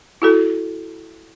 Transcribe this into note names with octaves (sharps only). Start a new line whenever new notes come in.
E4 F#4 A4